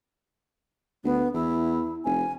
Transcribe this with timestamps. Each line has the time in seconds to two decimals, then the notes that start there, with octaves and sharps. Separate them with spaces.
1.04 D2 B3
1.34 E2 E4
2.05 F1 G#5